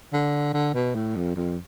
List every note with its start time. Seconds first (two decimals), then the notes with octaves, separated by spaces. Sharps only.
0.13 D3
0.54 D3
0.74 B2
0.95 A2
1.16 F2
1.36 F2